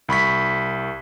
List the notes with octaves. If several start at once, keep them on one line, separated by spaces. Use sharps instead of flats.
C2 B5 C#6 B6